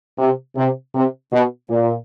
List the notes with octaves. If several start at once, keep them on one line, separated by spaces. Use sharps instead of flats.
C3
C3
C3
B2
A#2